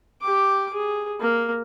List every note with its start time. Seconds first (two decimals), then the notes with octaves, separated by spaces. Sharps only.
0.22 G4 D6
0.73 G#4
1.20 A#3